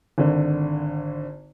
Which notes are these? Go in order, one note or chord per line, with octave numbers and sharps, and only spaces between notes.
G#1 D3